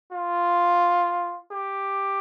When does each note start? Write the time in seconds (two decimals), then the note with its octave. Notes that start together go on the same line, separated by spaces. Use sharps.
0.12 F4
1.52 G4